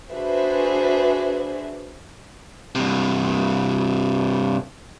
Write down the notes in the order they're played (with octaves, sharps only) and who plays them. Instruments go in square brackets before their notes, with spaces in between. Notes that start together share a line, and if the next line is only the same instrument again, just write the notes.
[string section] D4 F#4 G#4 B4 C5 E5
[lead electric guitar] G2 C3